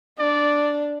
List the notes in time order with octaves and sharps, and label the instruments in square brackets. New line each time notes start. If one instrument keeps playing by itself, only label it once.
[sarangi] D4 [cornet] D5